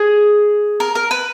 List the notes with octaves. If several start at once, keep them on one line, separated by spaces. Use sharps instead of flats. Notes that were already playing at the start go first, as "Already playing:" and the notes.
Already playing: G#4
A#4
A#4
B4